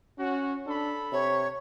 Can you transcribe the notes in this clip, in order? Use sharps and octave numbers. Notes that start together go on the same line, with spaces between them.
C#4 F#4
D4 A4 B5
C3 C#5